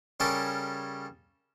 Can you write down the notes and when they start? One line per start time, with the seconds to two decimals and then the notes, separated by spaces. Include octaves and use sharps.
0.20 C#3 G3 C#4 G4 A4 A#4